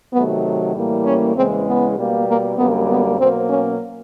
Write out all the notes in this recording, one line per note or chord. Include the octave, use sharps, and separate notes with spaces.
C3 D#3 F#3 A3 B3
A2 E3 G3 A#3
C#4
E2 C#3 E3 G#3 C4
B3
B2 G3 A#3
A#3
F#2 D3 G3 A#3 B3
B3
B2 F#3 A#3 C4
C#4